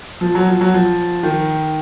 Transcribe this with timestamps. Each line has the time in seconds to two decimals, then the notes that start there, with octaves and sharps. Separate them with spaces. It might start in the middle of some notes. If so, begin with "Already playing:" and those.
0.21 F3
0.35 F#3
0.48 F3
0.61 F#3
0.74 F3
1.23 D#3